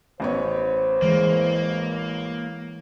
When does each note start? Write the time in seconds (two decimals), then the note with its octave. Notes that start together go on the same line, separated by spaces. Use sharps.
0.20 A1 B3 C5 C#5
1.02 E3 G#3 A#3